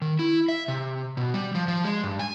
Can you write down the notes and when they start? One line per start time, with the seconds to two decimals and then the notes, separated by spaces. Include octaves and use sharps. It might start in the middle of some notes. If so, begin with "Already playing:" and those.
0.02 D#3
0.19 E4
0.48 E5
0.68 C3
1.17 B2
1.34 G3
1.55 F3
1.68 F3
1.84 G#3
2.03 G2
2.19 G#5